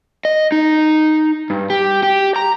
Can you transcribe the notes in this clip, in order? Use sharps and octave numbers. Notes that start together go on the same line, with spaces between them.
D#5
D#4
G2
G4
G4
A#5